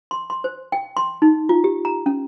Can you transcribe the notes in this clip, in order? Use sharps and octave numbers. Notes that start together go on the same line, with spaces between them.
C6
C6
C5
G5
C6
D#4
F4
G4
A#5
C#4